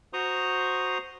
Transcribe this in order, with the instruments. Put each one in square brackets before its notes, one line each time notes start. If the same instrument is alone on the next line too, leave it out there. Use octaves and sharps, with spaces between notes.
[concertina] F#4 C5 A#5 C6 C#6 D#6